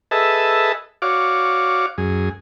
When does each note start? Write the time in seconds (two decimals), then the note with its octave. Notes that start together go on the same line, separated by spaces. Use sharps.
0.11 G#4 A4 B4 D#5 E5 A5
1.02 F#4 C#5 D5 F5 D6
1.98 F#2 G#4